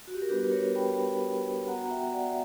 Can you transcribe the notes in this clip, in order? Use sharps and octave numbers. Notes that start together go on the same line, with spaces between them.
F#4
G4
A#4
G3 B3 D4 F#4 G4 B4
B4
A#4 C#5
G5 B5
B3 F#4 F#5 A#5
A#5
E5 G5
D5 F#5
E5